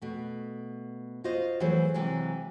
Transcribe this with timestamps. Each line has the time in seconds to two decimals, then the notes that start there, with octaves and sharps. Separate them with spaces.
0.02 B2 A3
1.24 F4 F#4 C5 D#5
1.60 E3 F#3 A3 G#4 C5 C#5
1.94 C3 E3 F#3 G#3